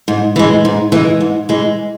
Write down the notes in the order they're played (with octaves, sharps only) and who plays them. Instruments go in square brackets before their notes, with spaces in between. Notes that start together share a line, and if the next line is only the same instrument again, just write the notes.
[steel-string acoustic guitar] G#2
E3 G#3
G#2
E3 G#3
G#2
E3 G#3